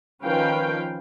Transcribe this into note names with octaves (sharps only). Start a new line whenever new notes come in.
D#3 F3 C#4 B4 F5 G5